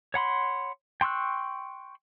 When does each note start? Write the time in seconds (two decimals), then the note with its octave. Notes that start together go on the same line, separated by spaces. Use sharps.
0.14 C#5 F#5 B5 C6
1.01 G5 C6 C#6 E6 F#6